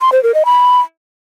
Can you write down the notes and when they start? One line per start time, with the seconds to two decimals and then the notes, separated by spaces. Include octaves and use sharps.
0.01 C6
0.12 C5
0.23 A#4
0.34 D#5
0.45 B5